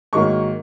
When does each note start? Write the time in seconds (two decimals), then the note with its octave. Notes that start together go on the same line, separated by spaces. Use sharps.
0.13 G#2 D#3 F#3 A#3 C#6